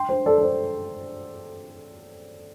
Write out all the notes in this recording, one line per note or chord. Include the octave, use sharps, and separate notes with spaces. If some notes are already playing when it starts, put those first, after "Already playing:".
Already playing: G5 C6
C5
A4 D5
A4
C5